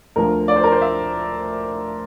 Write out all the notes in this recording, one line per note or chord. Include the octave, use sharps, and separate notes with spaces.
D2 D3 F3 A#4
D5
C5
A#4
C5
E5